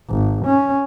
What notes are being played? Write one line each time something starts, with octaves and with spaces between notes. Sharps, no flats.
G#1
C#4